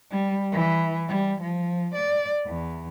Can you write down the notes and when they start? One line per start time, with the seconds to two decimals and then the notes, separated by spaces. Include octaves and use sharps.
0.11 G3
0.52 E3
1.08 G3
1.41 F3
1.95 D5
2.46 E2